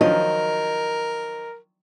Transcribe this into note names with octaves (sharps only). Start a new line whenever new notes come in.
D#3 F3 F#3 A#4 D#5